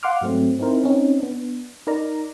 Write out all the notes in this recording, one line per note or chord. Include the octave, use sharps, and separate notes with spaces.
F5 F#5 C6 D6 F6
G#2 F#3 A3 C4
C4 D#4 E4 A#4 C5
C4 C#4 D#4
B3 D4
D#4 A#4 D5 A#5